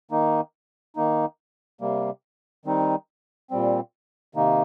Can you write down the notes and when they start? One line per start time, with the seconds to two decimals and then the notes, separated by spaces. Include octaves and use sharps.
0.11 D#3 A#3 D#4
0.96 D#3 A#3 D#4
1.81 C3 G3 A#3
2.66 D#3 G3 C4 D#4
3.51 A#2 G3 C4
4.35 C3 D#3 A#3 D#4